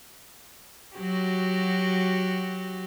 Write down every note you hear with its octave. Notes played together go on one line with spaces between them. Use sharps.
F#3 F#4 G4